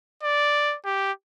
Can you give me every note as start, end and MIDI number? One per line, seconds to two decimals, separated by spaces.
0.23 0.76 74
0.85 1.12 67